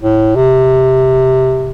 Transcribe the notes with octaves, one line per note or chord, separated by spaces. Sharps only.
A2
C3